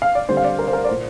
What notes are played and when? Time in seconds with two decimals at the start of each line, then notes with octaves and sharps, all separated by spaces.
0.02 F5
0.15 D5
0.29 D3 G3 C4 C5
0.37 F5
0.44 D5
0.59 A#4
0.68 C5
0.73 A#4
0.84 D5
0.89 A#2 A#3 C5